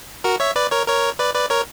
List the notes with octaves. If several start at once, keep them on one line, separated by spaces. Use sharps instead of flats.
F#4 A#4
C#5 E5
B4 D5
A#4 C#5
A#4 C#5
B4 D5
B4 D5
A#4 C#5